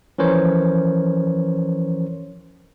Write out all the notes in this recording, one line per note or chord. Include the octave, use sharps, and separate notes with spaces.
E3 F3 C#4 A#4 C5 C#5